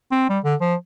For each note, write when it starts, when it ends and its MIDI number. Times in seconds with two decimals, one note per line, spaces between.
0.12 0.28 60
0.30 0.39 55
0.44 0.55 50
0.61 0.75 53